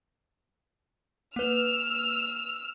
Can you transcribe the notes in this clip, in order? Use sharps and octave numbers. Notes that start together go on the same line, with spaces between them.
A#3 B4 E6 F6